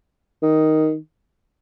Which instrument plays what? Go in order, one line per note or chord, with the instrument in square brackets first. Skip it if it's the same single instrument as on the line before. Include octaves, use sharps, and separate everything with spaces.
[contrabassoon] D#3